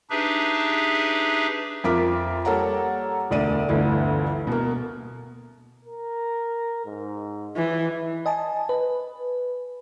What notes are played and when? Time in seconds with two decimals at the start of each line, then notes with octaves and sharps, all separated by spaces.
0.10 D4 D#4 G4 G#4 B4 E5
1.84 F2 F4 A#4 E5 D6 B6
2.45 G3 A#3 A4 C#5 F#5 A#5
3.30 E1 D2 D5 D#7
3.69 G1 D2 E3
4.47 B2 A#3
5.85 A#4
6.85 G#2
7.56 E3
8.26 D#5 G#5 A5
8.69 B4